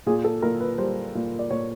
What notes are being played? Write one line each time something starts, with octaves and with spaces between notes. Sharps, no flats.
A#2 G#4
A4
A#2 A#4
B4
G3 C5
A#2
D5
A#2 C#5